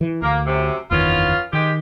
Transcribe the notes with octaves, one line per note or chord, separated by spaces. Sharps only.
E3
D2 A#3
F#2 C3
F#1 E2 D#3 B3 C#4 F4
D#3 G#3 G4